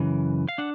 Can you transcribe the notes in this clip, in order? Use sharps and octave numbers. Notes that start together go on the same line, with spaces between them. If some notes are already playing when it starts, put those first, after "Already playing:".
Already playing: F#2 C#3 E3
F5
D4 F#5